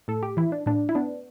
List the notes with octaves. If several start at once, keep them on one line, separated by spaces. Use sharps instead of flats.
A2 A4
G4
E3 E4
D4
A2 D4
E4
B3 D4